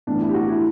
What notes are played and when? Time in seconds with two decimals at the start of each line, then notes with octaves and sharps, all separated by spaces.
0.07 B1 A2 E3 D4
0.20 E4
0.29 G4
0.34 F#4
0.49 E4